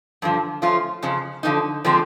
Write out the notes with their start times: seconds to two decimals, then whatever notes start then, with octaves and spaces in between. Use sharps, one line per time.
0.22 G2 D3 F3
0.62 F3 A3 C#4 F4
1.03 F2 C#3 F3
1.43 D3 F3 A#3 D#4
1.85 D3 F3 G#3 C4